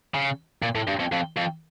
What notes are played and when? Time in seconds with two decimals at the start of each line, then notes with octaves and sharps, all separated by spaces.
0.14 C#3
0.62 A#2
0.75 A2
0.88 G2
1.00 F2
1.12 F2
1.37 F2